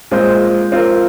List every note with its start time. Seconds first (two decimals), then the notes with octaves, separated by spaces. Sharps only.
0.11 A#2 G#3 C4 F4 C5
0.72 C4 F4 A#4